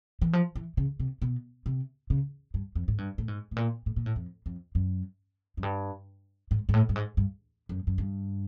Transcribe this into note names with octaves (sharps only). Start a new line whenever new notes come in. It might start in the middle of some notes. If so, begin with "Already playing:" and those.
E3
F3
E3
C#3
C3
B2
C3
C#3
G2
F2
G#2
G2
A2
G#2
A2
A#2
A2
A#2
A2
F2
F2
F#2
F#2
G2
G#2
G#2
A2
G2
G#2
G2
F#2
F#2
G2